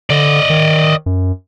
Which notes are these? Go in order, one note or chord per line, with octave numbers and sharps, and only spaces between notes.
D3 D5 D#5
D#3
F#2